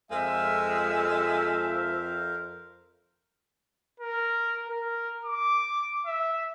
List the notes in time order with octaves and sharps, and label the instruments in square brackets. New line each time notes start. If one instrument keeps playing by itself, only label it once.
[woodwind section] F2 [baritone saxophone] G#3 [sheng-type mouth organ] A#4 C5 F5 [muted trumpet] E5
[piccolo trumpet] A#4
A#4
D6
E5